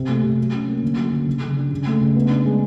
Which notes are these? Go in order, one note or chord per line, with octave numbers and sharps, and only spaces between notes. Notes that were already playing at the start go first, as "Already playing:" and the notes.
Already playing: C3 C4
A3
C3
F#3
C#4
A#3
D3
F#3
D3
C#3
C#3
D4
C#3
A3
C#3
B3
D4
G#3